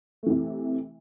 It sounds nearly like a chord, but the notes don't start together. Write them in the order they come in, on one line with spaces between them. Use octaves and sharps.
A3 E3 C3